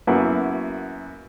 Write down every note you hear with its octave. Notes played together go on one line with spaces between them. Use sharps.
F#2 A#3 B3 E4 F#4